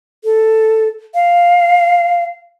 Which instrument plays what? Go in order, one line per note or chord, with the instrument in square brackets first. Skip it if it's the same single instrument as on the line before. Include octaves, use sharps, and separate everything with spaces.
[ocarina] A4
F5